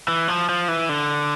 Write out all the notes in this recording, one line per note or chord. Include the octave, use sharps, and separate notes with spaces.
E3
F3
F3
E3
D3